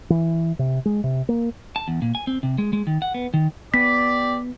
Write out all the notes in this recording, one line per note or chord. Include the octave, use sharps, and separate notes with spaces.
E3
C3
G#3
C3
A#3
A5
E2
A#2
G#5
C4
C3
G#3
G#3
D#3
F#5
B3
D#3
B3 G4 D5 B6